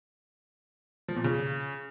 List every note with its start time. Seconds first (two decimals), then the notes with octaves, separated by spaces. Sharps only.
1.08 F3
1.16 A#2
1.24 C#3